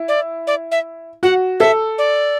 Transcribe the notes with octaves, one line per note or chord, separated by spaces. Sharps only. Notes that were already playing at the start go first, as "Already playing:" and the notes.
Already playing: E4
D5
D5
E5
F#4 F#5
A4 E5
D5